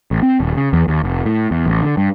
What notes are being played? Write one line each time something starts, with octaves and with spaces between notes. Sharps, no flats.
A1
C4
D#1
C#3
E2
D#2
F1
A2
E2
A1
D3
G2